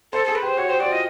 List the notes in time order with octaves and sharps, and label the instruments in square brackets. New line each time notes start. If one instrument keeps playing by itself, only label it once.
[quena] A4 [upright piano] C5
[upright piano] G#4 [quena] A4
[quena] B4
[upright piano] G4 [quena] C5
[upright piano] F#4 [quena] C#5
[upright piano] G4 [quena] C5
[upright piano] F#4 [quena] D5
[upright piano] F4 [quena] D#5